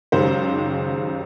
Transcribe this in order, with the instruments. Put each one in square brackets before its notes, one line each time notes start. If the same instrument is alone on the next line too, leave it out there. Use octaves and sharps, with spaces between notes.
[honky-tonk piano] C#2 F#2 D#3 G#3 G4 C5